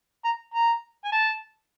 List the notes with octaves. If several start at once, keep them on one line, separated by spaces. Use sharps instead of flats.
A#5
A#5
G#5
A5